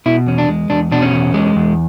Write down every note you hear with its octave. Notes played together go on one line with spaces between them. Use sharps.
B2 E4
E2 C#4
D4
G#3
E2 D4
B2 D4
C#4
E2
G#3
E2